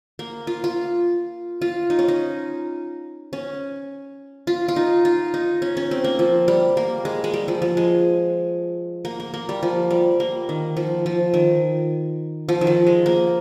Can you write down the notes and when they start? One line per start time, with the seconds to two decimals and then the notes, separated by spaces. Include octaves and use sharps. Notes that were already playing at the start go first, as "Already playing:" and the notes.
0.19 A#3
0.47 F4
0.64 F4
1.62 F4
1.90 D#4
1.99 C#4
2.08 D#4
3.33 C#4
4.47 F4
4.68 F4
4.76 D#4
5.05 F4
5.34 D#4
5.62 C#4
5.77 C#4
5.91 C4
6.04 A#3
6.19 F3
6.48 G3
6.77 A#3
7.05 G#3
7.24 G#3
7.34 G3
7.48 F3
7.62 F3
7.77 G#3
9.05 A#3
9.20 A#3
9.34 A#3
9.49 G3
9.63 F3
9.91 G3
10.20 A#3
10.49 D#3
10.77 F3
11.06 F3
11.34 D#3
12.49 F3
12.61 D#3
12.67 F3
12.87 G#3
13.06 A#3